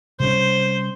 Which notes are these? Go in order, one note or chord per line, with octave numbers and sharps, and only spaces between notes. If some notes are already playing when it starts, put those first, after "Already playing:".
C3 G3 C#4 C5